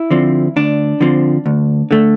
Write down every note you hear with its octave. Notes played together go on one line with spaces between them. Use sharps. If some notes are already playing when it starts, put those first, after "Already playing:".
Already playing: E4
D3 F3 C4
D2 D4
D3 F3 C4
D2
D3 A3